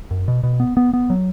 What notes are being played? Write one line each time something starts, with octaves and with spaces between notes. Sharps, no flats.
F#2
B2
B2
B3
B3
B3
F#3